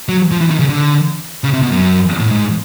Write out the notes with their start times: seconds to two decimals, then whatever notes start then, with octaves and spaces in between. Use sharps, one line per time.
0.09 F#3
0.32 F3
0.41 E3
0.50 D#3
0.59 C#3
0.70 D3
1.44 C#3
1.53 C3
1.62 B2
1.72 F#2
2.19 A2
2.31 G#2